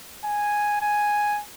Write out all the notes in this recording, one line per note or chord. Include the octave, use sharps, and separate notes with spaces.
G#5
G#5